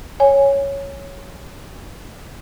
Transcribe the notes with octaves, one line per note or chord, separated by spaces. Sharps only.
C#5 G#5